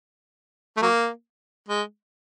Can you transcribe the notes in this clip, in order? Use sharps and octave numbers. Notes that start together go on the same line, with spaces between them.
A3
F#3 A#3
G#3